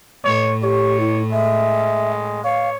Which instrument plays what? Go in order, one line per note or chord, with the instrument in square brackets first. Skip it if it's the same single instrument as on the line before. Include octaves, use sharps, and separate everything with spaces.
[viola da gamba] A2 [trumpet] C#5
[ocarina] G4 [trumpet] C#5
[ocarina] E4
[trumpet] G#3 [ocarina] E5
[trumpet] C#5 [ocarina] F5